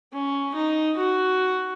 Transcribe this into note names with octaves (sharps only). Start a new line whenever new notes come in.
C#4
D#4
F#4